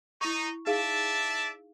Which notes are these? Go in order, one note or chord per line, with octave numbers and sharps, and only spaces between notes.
D#4 E4 C#6
D#4 G#4 D5 E5 F5 A5